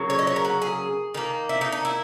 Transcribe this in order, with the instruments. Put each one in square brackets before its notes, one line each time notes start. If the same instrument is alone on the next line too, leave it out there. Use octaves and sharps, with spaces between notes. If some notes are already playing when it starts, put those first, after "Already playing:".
Already playing: [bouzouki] C#3 F#3 A#3
C#5
D#5
C#5
A#4
F#4
G#4
D#3 A#3
E4
D#4
D#4
E4